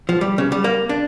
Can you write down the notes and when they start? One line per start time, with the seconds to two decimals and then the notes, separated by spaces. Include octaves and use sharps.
0.09 F3
0.21 G3
0.38 C#3
0.52 G3
0.64 A#3
0.89 D4